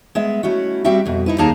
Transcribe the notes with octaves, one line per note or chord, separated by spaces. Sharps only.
G#3 B3 E5
A3 C#4 E4 F#4
G3 C4 F#4 E5 G5
F2 B2
D#4 E4 B4
D#2 A#3 D#4 G#4 A5 A#5